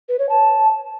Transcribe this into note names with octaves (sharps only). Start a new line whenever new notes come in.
B4
C#5
A5